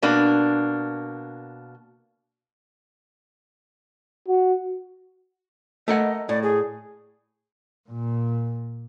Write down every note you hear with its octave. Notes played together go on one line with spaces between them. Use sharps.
B2 A#3 D4
F#4
A3 A#4 D#5 F#5
A2 D5
G#4
A#2